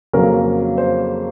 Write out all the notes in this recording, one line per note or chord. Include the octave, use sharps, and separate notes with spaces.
F2 C#3 F#3 A#3 C#4 A#4
C5